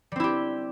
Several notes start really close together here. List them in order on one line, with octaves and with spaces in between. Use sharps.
G3 C4 E4 G4